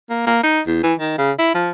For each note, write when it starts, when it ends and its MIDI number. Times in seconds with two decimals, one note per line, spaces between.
0.10 0.26 58
0.26 0.41 58
0.43 0.60 63
0.67 0.79 40
0.83 0.94 52
0.99 1.14 51
1.18 1.31 49
1.39 1.54 64
1.54 1.71 53